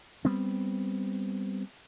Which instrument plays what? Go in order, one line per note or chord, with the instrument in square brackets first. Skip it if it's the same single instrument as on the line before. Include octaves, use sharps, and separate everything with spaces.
[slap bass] G3 B3 C4